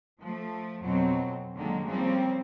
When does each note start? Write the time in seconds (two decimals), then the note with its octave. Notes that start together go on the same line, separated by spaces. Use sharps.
0.21 F3 A3
0.83 F2 B2 F#3 C4
1.57 D3 D#3 F#3 G#3 A#3
1.86 C#3 F3 G3 A#3 C4